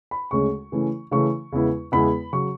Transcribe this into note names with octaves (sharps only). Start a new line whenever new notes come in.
B5
D2 C#3 G#3 C#4 C#6
C#3 E3 A3 C#4
C#3 E3 A3 C#4 C#6
E2 C#3 G#3 B3 E4
E2 C#3 G#3 B3 E4 B5
C#3 F#3 C#6